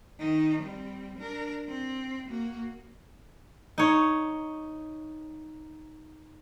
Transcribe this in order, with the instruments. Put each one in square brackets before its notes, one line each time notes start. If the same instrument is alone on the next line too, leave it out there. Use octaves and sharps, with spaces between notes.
[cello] D#3 D#4
G3 C4
D4 A#4
C4
A#3 F#4
[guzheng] D#4 C#5